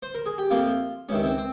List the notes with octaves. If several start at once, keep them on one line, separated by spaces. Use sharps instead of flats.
C5
A#4
G#4
G4
F2 C3 F3 A#3 F4
C#2 C3 D#3 C#4
C4
C4